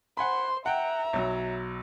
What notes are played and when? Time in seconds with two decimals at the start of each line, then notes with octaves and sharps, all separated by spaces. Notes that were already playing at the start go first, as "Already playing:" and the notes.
0.17 C5 F#5 G#5 B5 C6
0.66 E5 F#5 G5 A#5
1.13 B1 F#3